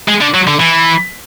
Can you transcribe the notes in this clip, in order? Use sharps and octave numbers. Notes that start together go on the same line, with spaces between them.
G#3
D3
F#3
D3
E3